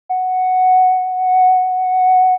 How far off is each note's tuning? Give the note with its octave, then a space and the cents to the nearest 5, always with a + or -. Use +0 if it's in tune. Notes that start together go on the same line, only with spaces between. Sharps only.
F#5 +0